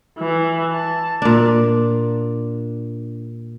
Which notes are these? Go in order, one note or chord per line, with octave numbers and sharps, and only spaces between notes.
E3
A5
A#2 D4